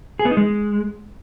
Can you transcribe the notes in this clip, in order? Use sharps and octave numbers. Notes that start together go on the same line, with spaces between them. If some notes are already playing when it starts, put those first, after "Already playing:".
G#4
B3
D#4
G#3